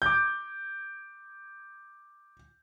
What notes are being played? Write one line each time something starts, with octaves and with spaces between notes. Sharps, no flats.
D6 G6